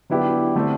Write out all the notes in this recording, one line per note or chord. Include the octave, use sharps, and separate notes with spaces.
D3 F#3 B3 E4 G4
D3 A3 C4